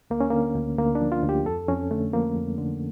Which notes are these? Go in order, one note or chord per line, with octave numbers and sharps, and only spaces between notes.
D2 A#3
C#4
D3 A#3
D2
D2 A#3
D4
F3
F4
D2
G4
F2 A4
F2 C#4
D3 A3
F3 A#3
F2
D3